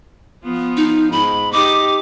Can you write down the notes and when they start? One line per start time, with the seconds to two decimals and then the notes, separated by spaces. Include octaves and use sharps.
0.44 F3 B3 F4
0.77 D#4
1.12 G#2 B5
1.52 D#4 G4 D6